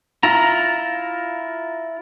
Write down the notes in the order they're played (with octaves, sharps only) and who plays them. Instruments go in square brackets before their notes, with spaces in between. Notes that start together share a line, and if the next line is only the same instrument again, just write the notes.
[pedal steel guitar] E4 F4 A#5